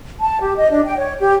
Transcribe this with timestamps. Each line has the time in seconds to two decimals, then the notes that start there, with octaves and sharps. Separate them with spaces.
0.20 A5
0.41 G4
0.57 D#5
0.70 D4
0.84 G5
0.98 C#5
1.20 G4